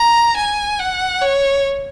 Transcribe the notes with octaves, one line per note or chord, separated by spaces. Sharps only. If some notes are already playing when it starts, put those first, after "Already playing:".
Already playing: A#5
G#5
F#5
C#5